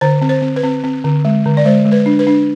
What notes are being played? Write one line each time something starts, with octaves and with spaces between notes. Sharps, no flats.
D3 C5
C4
C5
C4
B4
C4
C4
D3
G#3
D3
D5
G#3 C5
G#3
B4
D4
B4
D4